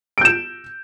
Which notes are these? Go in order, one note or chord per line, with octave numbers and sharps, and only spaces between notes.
G6 D7 E7